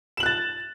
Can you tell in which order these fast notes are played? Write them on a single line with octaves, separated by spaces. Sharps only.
E7 F#7 F#6 A6